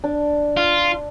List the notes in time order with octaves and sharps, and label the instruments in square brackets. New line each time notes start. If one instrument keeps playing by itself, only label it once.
[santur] D4
[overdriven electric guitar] F4